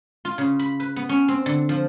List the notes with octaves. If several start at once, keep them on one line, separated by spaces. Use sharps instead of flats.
F4
C#3
B5
B4
B3
C#4
C4
D3
F3